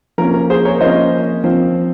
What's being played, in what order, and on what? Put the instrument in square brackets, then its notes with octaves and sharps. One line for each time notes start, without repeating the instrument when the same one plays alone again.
[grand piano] F3 A#3 C#4 A#4
A#4
G#4 C5
A#4 C#5
F3 A#3 C#4 C5 D#5
F3 C4